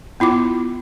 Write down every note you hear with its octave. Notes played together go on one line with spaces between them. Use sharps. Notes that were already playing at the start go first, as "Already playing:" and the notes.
B3 E4 F4 D6